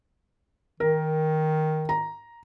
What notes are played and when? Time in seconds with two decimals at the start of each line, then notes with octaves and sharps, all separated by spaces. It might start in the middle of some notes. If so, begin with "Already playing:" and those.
0.80 D#3 A#4
1.89 A#5